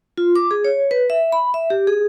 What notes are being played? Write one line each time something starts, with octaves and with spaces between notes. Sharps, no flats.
F4
D6
G#4
C#5
B4
E5
B5
E5
G4
G#4